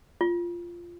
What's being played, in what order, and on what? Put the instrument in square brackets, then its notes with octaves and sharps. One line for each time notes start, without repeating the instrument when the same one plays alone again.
[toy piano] F4